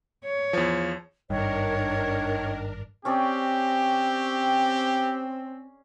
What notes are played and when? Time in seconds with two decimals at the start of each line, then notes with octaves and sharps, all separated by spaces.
0.25 C#5
0.53 E2 F3
1.30 G#1 G2 D#3 D4 A#4 C#5
3.05 C4 C#4 G4 G#4 D5